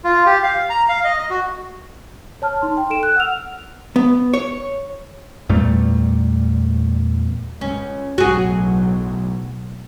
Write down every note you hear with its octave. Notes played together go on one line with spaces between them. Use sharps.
F4
G4
F5
A#5
F5
D#5
D#5
F#4
C#5 A5 F6
D#4 C6
G5
A4 D7 E7
F#6
F#5 E6 F6 F7
B3
C#5
E2 A#2 G3 A3
C#2 C#4
B1 A2 F#3 F#4 G#4